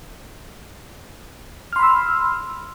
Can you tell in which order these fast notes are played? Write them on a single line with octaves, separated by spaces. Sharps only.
F6 C6 B5 E6